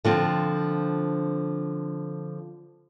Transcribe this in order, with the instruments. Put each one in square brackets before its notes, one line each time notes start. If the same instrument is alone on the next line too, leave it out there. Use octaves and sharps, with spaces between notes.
[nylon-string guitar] D3 F3 C4